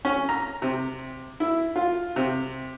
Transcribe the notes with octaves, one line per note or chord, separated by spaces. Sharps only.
C#4
A#5
C3
E4
F4
C3